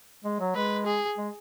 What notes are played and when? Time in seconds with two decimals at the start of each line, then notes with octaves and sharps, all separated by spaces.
0.25 G#3
0.40 F#3
0.55 G#3 B4
0.86 G#4
1.18 G#3